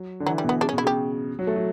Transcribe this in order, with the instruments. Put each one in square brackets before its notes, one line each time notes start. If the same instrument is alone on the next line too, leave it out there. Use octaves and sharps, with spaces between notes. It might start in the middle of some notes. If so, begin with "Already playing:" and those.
Already playing: [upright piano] F#3
D3
[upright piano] E3 [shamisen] F#3
[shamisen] G3
[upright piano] B2
[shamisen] B3
[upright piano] C#3 [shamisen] D4
[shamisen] C#4
[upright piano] B2
[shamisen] E4
[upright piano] C#3 [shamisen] G4
[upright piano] F#3
A3
F#3